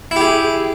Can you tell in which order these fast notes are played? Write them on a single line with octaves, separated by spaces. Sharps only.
E4 G4 G#4